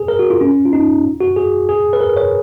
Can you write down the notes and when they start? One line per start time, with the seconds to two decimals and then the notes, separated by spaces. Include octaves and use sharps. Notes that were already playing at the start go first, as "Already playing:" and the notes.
Already playing: G#4
0.08 A#4
0.19 F#4
0.30 F4
0.41 C#4
0.65 F4
0.73 D#4
1.20 F#4
1.36 G#4
1.69 G#4
1.93 B4
2.01 A#4
2.17 C#5